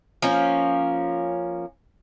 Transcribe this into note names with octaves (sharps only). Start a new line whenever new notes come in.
F3 A#3 C#4